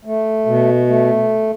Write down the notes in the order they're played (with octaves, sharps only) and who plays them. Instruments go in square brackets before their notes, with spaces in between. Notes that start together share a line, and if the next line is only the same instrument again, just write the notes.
[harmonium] A3
B2
A3